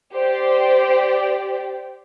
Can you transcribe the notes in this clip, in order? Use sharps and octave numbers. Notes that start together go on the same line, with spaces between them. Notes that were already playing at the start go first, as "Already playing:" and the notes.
G4 C5 D5 G5